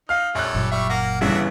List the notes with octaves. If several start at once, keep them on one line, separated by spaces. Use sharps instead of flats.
D#4 F5 F6
A#1 G3 C#4 A4 F#6
F#1 A#2 F#3
G3 E5 C#6
A#3 F#5 A#5
G1 C#3 E3 D4 F#4 E5